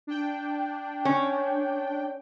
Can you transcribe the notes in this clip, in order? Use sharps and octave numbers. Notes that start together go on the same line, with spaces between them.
D4 G5
C#4